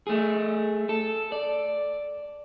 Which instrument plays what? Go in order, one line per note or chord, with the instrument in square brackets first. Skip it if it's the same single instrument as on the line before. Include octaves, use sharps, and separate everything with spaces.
[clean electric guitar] A3 G#4
A4
D5